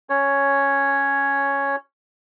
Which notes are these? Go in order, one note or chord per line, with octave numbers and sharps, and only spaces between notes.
C#4 C#5